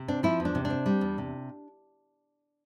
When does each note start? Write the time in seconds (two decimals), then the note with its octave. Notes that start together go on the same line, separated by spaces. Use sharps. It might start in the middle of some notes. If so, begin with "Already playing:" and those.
Already playing: C3
0.08 C4 D4
0.23 F3 E4
0.40 E2
0.45 D4
0.55 C3
0.65 D4
0.70 C4
0.86 G3
1.01 E2
1.18 C3